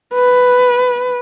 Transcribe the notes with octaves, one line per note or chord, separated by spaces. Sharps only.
B4